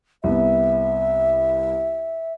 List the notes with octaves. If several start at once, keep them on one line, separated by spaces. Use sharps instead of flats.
C2 B3 E5